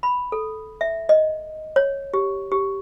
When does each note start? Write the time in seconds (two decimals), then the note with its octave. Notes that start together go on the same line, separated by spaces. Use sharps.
0.03 B5
0.32 A4
0.81 E5
1.09 D#5
1.76 C#5
2.14 G4
2.52 G4